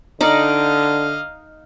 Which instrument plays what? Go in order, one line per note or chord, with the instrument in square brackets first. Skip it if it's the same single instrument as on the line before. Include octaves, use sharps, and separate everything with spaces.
[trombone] D3 [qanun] D#4 D5 [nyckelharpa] D#5 F5